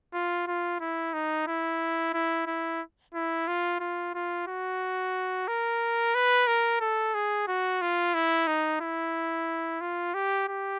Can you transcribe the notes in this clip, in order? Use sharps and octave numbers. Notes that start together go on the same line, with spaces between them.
F4
F4
E4
D#4
E4
E4
E4
E4
F4
F4
F4
F#4
A#4
B4
A#4
A4
G#4
F#4
F4
E4
D#4
E4
F4
G4
G4